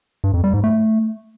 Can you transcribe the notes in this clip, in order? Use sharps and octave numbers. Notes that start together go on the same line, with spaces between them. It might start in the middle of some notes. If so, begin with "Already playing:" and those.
G2
F2
G3
G#2
A3